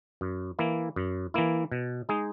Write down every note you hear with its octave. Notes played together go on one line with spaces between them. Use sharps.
F#2
E3 A#3 E4
F#2
E3 A#3 E4
B2
G#3 D#4 G#4